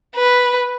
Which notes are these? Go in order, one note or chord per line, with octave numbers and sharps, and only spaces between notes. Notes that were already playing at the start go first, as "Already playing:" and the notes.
B4